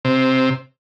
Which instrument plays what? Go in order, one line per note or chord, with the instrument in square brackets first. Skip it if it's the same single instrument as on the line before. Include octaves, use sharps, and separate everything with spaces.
[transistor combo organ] C3